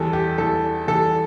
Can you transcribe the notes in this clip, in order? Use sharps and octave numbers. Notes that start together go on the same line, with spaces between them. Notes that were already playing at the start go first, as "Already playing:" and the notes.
Already playing: E2 E3 G3 A4
G4
E2 E3 G3 A4
E2 E3 G3 A4